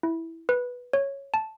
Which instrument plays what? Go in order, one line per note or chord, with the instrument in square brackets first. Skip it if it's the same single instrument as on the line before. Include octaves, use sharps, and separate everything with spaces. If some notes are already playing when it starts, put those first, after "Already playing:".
[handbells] E4
B4
C#5
A5